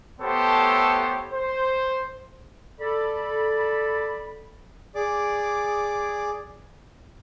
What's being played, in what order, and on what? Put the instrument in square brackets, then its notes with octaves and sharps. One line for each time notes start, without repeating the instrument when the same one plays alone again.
[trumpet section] A3 B3 G4 A4 C5 C#5
C5
[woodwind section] A4 D5 B5
[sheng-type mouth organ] G#4 D5 D6